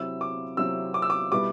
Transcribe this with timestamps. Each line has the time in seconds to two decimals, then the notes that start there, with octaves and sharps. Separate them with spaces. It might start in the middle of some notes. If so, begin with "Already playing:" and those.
Already playing: C3 F#3 C4 E4 E6
0.21 D6
0.57 C3 F#3 C4 E4 E6
0.94 D6
1.02 E6
1.10 D6
1.32 B2 G3 B3 E4 D6